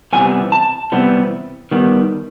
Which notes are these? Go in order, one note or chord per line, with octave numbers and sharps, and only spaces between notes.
C3 E3 G3 B3 G#5
A5
C3 E3 G3 B3
D#3 G3 B3